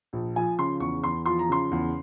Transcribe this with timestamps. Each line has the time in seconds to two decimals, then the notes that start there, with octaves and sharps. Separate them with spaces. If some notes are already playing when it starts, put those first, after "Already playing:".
0.13 A#1
0.36 F3 G#5
0.59 C#3 C6
0.80 E2 C#6
1.03 E2 C6
1.26 F3 C6
1.39 A#5
1.49 C#3 C6
1.71 E2